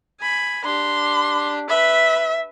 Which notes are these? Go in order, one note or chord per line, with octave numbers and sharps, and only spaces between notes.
G#5 B5
D4 G4 C6
B4 E5 B5